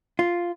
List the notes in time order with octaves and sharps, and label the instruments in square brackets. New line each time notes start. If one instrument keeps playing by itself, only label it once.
[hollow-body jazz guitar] F4